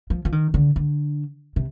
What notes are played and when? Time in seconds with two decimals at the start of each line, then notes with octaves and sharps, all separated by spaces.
0.10 F3
0.25 F3
0.32 D#3
0.54 D3
0.76 D3
1.56 C3